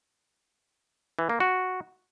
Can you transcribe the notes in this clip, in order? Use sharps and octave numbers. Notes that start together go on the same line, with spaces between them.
E3
A#3
F#4